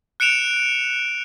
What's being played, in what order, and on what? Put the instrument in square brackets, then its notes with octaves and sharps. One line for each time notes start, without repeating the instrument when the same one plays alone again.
[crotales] F#6 C#7 D7 E7 F7